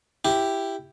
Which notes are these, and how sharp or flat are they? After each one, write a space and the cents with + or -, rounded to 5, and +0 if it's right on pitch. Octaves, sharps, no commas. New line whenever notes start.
E4 +10 G4 +0